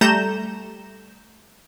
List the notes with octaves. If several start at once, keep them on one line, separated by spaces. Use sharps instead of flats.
G3 A3 A#5 G6 E7